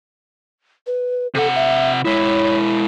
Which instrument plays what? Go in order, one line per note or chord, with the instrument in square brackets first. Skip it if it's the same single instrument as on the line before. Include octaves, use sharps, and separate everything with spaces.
[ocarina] B4
[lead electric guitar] C3 F#5 [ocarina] A4
[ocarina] E5
[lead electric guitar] G#3 E4 [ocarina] C#5